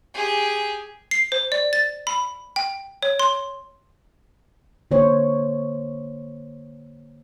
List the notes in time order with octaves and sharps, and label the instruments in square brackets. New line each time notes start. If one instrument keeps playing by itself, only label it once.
[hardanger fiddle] G4 G#4
[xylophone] C7
C5
D5
A6
B5
G5
C#5
C6
[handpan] D3 A#3 C5 C#5